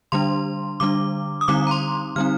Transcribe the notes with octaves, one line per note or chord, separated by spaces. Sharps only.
D3 G3 D4 C6
D3 G3 D4 D6
D#6
D3 G3 C4 D#4 D6
A#5
C6
D3 G3 C4 D#4 F6